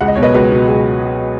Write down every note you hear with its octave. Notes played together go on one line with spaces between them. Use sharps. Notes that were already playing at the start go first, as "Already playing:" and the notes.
C#2 F#5
D#5
B2 F#3 C#5
B4 D#5
C#2 F#4 B4
B2 F#3
C#2 G#4